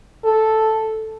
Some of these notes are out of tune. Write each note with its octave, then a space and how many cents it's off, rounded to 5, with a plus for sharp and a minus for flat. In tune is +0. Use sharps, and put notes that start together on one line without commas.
A4 -5